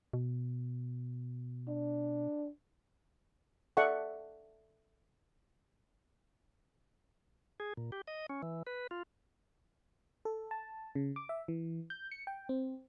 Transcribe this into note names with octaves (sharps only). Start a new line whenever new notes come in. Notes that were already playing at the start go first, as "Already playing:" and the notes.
B2
D4
A4 D5 E5 F#5 C#6
G#4
A#2
G4
D#5
C#4
E3
B4
F4
A4
A5
C#3
D6
E5
E3
G6
C#7
G5
C4